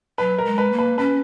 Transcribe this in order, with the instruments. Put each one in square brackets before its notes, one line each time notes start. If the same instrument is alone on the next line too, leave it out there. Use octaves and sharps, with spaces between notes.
[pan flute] F#3 [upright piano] B4
[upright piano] A#4
[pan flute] G#3
[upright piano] B4
[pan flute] A#3
[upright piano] B4
[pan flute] C#4 [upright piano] B4